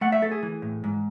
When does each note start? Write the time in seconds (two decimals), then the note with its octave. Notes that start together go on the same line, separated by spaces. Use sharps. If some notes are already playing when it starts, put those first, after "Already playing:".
0.01 A3 F#5
0.12 E5
0.22 A3 A4
0.32 G#4
0.43 E3
0.62 A2
0.84 G#2